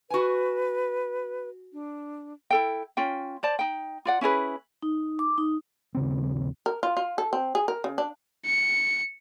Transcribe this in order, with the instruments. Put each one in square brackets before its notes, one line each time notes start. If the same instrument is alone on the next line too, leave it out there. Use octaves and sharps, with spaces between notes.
[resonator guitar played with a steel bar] F#4 G#5 [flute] B4
[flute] D4
[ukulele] E4 A4 G5
C#4 F4 G5
C5 D5 A5
D#4 G5
F4 D5 F#5
C#4 E4 G#4 B4
[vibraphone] D#4
D6
D#4
[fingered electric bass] D#1 C#3 C4
[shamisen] A#4
F4
F4
A4
C4
G#4
A#4
C#3
D4
[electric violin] C#7